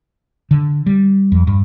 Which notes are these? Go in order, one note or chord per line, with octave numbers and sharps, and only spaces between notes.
D3
G3
F2
G2